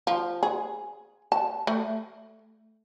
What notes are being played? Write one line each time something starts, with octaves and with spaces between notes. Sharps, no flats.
F3
G#4
A5
A3